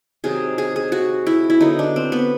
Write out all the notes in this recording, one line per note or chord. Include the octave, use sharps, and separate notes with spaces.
C3 D#3 F#3 G#4
G#4
G#4
F#4
E4
E4
D3 F#3 B3 D#4
D4
C4
B3